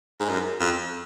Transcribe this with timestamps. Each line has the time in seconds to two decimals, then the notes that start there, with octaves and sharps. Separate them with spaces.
0.20 G#2
0.29 F#2
0.60 F2